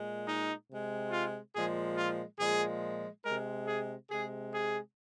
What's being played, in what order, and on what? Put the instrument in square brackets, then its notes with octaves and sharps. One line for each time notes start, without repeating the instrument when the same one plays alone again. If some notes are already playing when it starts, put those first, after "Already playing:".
Already playing: [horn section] A#2 G#3
D#4
C3 G#3
F4
A#2 F3 G#3 G#4
F4
A#2 F3 G#3 G#4
C3 G#3 A#4
G#4
C3 G#3 G#4
G#4